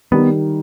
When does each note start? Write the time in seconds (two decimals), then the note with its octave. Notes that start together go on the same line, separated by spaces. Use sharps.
0.12 D#3 G3 B3